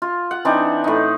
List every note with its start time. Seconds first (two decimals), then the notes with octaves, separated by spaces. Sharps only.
0.02 F4
0.31 F#5
0.45 E3 C4 D4 D#4
0.84 A2 D#4